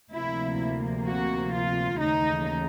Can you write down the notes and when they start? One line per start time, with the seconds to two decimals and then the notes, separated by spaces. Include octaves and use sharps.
0.11 D2 C3 F3 A#3 E4
1.07 F#4
1.54 F4
2.01 D#2 C#3 E3 A3 D#4